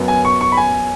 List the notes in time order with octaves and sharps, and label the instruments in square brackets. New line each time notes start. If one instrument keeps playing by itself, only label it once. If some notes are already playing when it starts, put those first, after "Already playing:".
Already playing: [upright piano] F#2 F#3 B3
[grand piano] G#5
C#6
C#6
B5
G#5